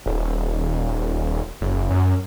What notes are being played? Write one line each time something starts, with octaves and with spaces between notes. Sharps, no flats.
D#1
F#1
F#2